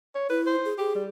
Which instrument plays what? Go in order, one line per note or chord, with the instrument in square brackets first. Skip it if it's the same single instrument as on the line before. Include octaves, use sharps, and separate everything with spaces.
[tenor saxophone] C#5
[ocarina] E4 [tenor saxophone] B4
[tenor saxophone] C5
[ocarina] G#4
[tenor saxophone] G4 [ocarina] G#4
[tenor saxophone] G3